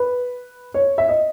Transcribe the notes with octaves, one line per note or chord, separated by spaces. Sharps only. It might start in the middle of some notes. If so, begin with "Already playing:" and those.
Already playing: B4
C#5
E5
D#5